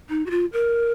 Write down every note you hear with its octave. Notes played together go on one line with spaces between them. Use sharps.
D#4
F#4
F4
A#4